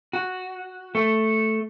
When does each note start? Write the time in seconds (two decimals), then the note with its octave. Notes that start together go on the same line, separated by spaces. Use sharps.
0.13 F#4
0.95 A3